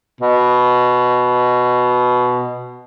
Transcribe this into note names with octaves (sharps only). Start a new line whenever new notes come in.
B2